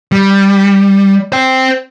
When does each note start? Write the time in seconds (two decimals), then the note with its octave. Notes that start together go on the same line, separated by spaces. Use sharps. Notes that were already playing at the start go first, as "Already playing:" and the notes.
0.12 G3
1.32 C5 G5